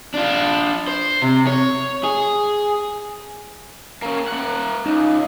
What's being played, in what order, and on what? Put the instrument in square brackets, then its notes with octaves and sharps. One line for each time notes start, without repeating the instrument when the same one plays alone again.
[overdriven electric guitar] D4 F4
C5
C3
C#5
G#4
A#3 C#4
A#3 F#5
[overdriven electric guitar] C#2 [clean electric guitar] D#4